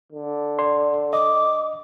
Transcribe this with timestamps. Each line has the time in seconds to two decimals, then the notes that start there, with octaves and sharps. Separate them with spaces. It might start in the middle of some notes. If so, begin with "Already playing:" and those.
0.12 D3
0.59 D5 C6
1.13 D#5 D6